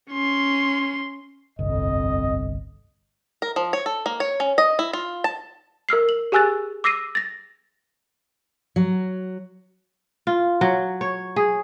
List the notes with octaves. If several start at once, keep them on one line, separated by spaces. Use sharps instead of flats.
C#4 C6
G1 C2 F2 D#5
A#4
F3
C#5
A4
A#3
C#5
C#4
D#5
E4
F4
A5
A#4 E6 F6 C7
F#7
G4 G#4 G#5 E6 F#6 A6
D6 E6 A#6 C7 D#7
A6 A#6
F#3
F4
F#3
C#5
G#4